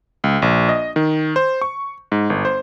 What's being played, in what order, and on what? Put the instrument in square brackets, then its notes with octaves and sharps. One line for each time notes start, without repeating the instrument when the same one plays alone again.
[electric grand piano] C#2
A#1
D#5
D#3
C5
C#6
G#2
G1
C5